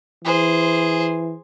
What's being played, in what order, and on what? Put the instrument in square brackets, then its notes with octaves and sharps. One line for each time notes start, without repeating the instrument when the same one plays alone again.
[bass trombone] E3 [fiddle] G#4 C5